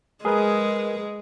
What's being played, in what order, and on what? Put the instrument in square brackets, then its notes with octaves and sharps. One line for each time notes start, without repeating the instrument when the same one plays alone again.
[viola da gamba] G#3 [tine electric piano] G#4 A#4 B4